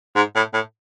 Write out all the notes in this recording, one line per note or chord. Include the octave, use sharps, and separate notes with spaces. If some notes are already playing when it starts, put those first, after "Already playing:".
G#2
A2
A2